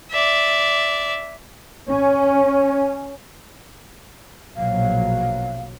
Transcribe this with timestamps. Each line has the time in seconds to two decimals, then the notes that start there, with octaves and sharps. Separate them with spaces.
0.11 D5 E5
1.89 C#4
4.56 A#1 B2 F#3 F5